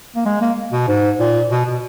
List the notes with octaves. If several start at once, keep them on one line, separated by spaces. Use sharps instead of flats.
A#3
G#3
A#3
B2
G#2
A#2
B2
B2